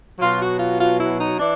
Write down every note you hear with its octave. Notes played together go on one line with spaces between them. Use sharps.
B2 F#3 F4
F#4
F4
F4
E4
D#4
E3 D4